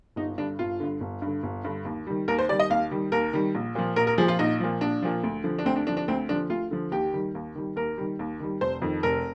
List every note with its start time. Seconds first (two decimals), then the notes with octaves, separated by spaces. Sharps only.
0.16 G1 D#4
0.38 G2 D3 D4
0.59 G1 F4
0.80 G2 D3
1.01 G1
1.22 G2
1.27 D3
1.43 G1
1.64 G2 D3
1.85 D#2
2.07 D#3 G3
2.28 D#2 A#4
2.39 C5
2.49 D#3 G3 D5
2.59 D#5
2.70 D#2 F5
2.91 D#3 G3
3.12 D#2 A#4
3.33 D#3 G3
3.55 A#1
3.75 A#2 F3
3.96 A#1 A#4
4.07 A#4
4.18 A#2 F3 G#4
4.28 F4
4.39 A#1 D#4
4.60 A#2 F3
4.81 A#1 D4
5.02 A#2 F3
5.23 D2
5.44 D3 F3
5.59 D4
5.65 D2 C4
5.76 D4
5.87 D3 F3 D4
5.97 D4
6.08 D2 C4
6.29 D3 F3 D4
6.50 D2 F4
6.71 D3 F3
6.92 D#2 G4
7.14 D#3 G3
7.35 D#2
7.55 D#3 G3
7.76 D#2 A#4
7.98 D#3 G3
8.19 D#2
8.40 D#3 G3
8.61 F1 C5
8.82 F2 D#3
9.03 F1 A#4